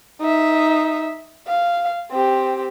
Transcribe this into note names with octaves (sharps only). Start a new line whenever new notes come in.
D#4 E5
F5
C4 G4